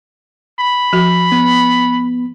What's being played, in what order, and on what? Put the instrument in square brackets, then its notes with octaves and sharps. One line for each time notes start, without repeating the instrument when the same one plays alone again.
[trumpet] B5
[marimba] F3 F#4
[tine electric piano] B3